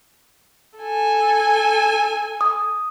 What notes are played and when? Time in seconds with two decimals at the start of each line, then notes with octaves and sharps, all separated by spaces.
0.79 A4 G#5
2.41 D#6